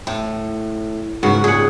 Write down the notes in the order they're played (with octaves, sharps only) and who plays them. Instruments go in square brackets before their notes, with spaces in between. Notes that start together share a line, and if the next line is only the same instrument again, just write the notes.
[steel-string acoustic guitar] A2
[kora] G#2 C#3 B3 [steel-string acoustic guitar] F#4
[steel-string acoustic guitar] G2 A#2 [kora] G#4 F#5